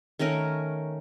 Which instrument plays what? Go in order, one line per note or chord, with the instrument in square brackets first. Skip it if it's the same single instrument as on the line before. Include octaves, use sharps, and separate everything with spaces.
[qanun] D#3 A3 C#4 A#4